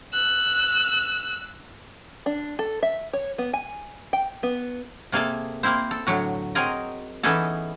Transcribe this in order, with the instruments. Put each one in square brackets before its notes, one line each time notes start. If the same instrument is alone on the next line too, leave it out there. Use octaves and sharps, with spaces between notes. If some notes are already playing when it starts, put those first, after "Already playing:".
[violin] E6 F#6
[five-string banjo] D4
A4
E5
C#5
B3
G#5
G5
B3
[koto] C3 A#3 G#4 A4 A5
A#3 C4 E4 C5
A4
A2 D3 F#3 F#4
F#3 C4 G#4 A#4 D#5
E3 B3 C#4 D#4 G#4 A4